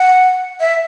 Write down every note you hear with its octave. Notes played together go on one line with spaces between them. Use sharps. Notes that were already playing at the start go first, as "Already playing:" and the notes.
Already playing: F#5
E5